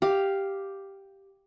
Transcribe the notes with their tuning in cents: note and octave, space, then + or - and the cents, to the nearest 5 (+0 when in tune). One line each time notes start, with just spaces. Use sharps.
G4 +0 F5 +0